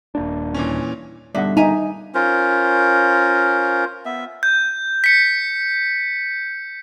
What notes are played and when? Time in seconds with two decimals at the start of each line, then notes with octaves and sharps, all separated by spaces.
0.15 D#1 A#3 D4
0.54 A#2 E3 C#4
1.35 G2 B2 D3 D4 D#4 D5 E5 F#5
1.57 D#4 E5 G#5 A#5
2.15 C#4 F4 A#4 C5
4.06 B3 E5
4.43 G6
5.04 B6 C#7